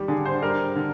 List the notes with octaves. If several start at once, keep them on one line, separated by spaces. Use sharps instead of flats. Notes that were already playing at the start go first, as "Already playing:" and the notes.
Already playing: D#3 G3 G4
D3 G#4
C5
G3 A#4
D3